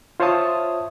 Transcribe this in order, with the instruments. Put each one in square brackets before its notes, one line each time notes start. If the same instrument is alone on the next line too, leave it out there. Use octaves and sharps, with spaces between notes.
[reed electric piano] F4 C5 C#5 E5 A5 D#6